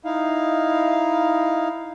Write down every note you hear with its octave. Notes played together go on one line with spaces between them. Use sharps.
D#4 E4 F5